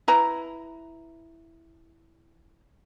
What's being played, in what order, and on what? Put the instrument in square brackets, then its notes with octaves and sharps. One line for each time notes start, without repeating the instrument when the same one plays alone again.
[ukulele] E4 B4 A#5